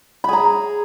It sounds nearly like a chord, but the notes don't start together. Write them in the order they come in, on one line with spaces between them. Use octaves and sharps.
B5 G#4 A#5